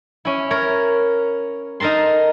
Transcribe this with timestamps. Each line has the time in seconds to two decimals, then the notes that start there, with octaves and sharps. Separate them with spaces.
0.25 C#4 E4
0.51 A#4 C#5
1.80 D#4 A4 A#4 A5 C6